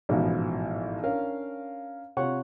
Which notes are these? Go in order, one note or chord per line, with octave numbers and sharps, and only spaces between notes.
A1 G#2 B2 F3
C#4 D4 A#4 F5
C3 F4 C#5 F#5 C#6